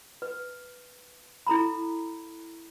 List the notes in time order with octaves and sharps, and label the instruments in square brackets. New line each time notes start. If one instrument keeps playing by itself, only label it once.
[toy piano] B4
E4 A4 A#5 B5